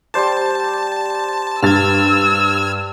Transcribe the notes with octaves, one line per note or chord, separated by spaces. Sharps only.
G3 C5 A5 D6
G2 E6 F6 G#6 A6